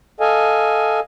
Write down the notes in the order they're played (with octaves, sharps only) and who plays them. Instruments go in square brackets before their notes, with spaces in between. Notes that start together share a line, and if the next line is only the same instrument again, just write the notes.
[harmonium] A4 D#5 F5 G#5